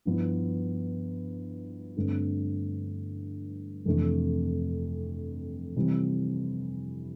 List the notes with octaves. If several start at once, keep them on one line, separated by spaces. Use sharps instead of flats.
G2 F3 B3 E4
G2 D3 A3 C4
F2 C3 E3 A3 D4
C3 E3 G3 C4 E4